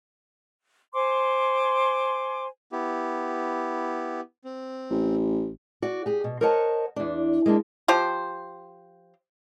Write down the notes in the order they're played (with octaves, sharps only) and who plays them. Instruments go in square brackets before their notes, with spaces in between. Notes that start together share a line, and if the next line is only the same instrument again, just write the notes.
[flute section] C5 G#5 C6 D6
[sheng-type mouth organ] B3 E4 G4
C4
[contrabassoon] A1
[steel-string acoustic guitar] F#4 D5
G4 G#4
B2
A#4 C5 C#5 D#5 F#5 A5
E2 D4
G#3 A#3 C#4 D4
[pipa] F3 G4 C5